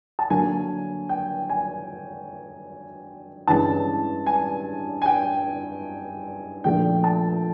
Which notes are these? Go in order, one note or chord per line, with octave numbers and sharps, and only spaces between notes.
A5
D3 F#3 A#3 G#5
G5
G#5
G2 E3 G#3 C#4 A5
G#5
G#5
G5
A#2 F3 A3 D4 G5
A5